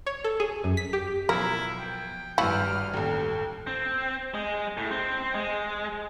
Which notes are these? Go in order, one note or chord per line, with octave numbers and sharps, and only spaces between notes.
C#5
A4
G#4
F#2
B6
G4
B2 F3 F#3 E4 A#4
G5
G#1 G2 E4 F#4 B4 F6
A1 D#2 A4
C4
G#3
A2
C4
G#3